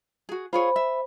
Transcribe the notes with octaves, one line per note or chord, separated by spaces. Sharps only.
F#4 G#4
F4 G#4 C5 C#5 B5
E5